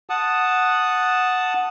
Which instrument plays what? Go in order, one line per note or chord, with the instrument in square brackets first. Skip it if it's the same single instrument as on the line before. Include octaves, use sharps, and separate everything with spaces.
[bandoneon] F#5 A5 D#6